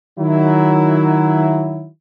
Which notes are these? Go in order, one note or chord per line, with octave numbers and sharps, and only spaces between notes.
D#3 F#3 E4